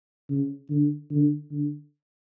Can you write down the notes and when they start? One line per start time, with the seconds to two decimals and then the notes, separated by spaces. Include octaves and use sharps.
0.30 C#3
0.70 D3
1.11 D3
1.51 D3